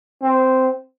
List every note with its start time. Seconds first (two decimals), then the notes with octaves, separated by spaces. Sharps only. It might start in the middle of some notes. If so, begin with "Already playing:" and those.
0.21 C4